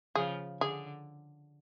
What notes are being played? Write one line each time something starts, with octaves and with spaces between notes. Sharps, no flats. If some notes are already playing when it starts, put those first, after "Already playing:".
C#3 F3 G#4
D3 G#4